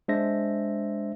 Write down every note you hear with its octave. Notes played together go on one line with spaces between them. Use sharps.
G#3 D4 C5 E5 A#6